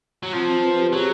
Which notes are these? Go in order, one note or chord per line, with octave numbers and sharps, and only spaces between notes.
F#3
F3 C4
C4
B4
G4
F#3 G#4